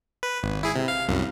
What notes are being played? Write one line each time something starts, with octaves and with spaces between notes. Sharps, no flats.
B4
G#1
E4 G#4
C3
F5
C2 F#2